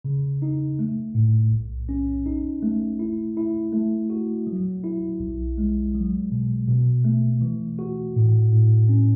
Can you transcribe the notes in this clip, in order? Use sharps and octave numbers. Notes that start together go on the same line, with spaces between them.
C#3
D#4
A3
A2
B1
C#4
D#4
A3
E4
E4
A3
F#4
F#3
E4
B1
G#3
F#3
B2
B2
A3
E3
F#4
A2
A2
C#4